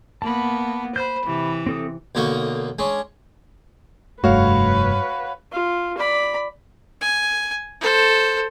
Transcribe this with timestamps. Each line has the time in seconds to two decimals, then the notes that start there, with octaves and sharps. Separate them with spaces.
0.22 A#3 B3 A5 B5
0.96 C5 B5 F#6 G6
1.25 C3 E3
1.67 C4 A4 D#6
2.15 B1 D3 A#3 D#4 C#6
2.79 G#3 C#4 D4
4.24 F1 G2 A3 F#4 B4 C#5 F5
5.52 F4
5.98 D5 B5
7.01 G#5
7.81 A4 C5